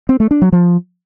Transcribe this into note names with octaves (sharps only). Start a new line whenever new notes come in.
C4
A3
D4
F#3
F3